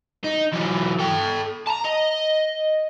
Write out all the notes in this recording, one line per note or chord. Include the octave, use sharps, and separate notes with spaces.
D#4
E3 F#3
A4 G5
A5 A#5
D#5